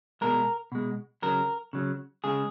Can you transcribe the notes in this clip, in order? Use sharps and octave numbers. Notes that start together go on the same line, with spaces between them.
B2 G#3 A#4
B2 G#3
C#3 F#3 A#4
C#3 F#3
C#3 G#3 G#4